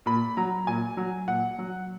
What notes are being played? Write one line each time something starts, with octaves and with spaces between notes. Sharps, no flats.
A#2 B5
F#3 A#5
A#2 G#5
F#3
A#2 F#5
F#3